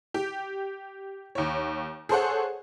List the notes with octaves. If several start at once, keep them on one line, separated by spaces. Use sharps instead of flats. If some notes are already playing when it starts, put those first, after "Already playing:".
G4
D#2 C#5
G#4 A4 C5 C#5 F#5